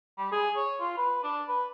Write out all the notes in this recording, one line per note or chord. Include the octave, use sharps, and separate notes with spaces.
G3
G#4
C#5
F4
B4
D4
B4